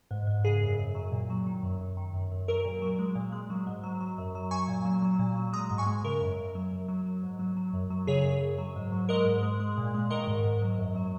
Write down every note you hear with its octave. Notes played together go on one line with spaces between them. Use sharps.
G#2
G#2
C#3 G#4
F#2
F#2
F#3
A#2
F#3
D#3
F#2
F#2
D#3
F#2
F#2
F#3 A#4
A#2
F#3
G#3
A#2
G#3
F#3
G#2
F#3
F#3
F#2
F#3
F#3 G#5 C#6
A#2
F#3
F#3
A#2
F#3
G#3 A#5 D#6
G#2
G#5 C#6
G#3
C#3 A#4
F#2
F#2
F#3
F#2
F#3
F#3
G#2
F#3
F#3
F#2
F#3
C#3 G#4 C#5
F#2
F#2
F#3
G#2
F#3
G#3 A#4 D#5
G#2
G#3
G#3
A#2
G#3
D#3 A#4 D#5
G#2
G#2
F#3
F#2
F#3